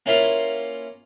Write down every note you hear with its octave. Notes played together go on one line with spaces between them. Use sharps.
A#3 C#4 E4 F4 F5